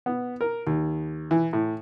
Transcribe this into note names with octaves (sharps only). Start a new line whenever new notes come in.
B3
A#4
D#2
E3
A2